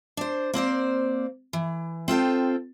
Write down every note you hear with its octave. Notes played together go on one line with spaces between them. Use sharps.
D4 C5
A#3 C4 C5 D5
E3
C4 F4 A4 G5